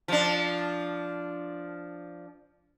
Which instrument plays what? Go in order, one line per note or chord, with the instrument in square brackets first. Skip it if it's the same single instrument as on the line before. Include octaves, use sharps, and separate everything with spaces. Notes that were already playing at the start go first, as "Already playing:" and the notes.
[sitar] F3 D4